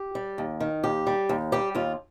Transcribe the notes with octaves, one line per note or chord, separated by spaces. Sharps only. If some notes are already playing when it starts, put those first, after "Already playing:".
Already playing: G4
G3
D#2
D#3
D#2 G4
G3
D#2
G3 G4
D#2 F4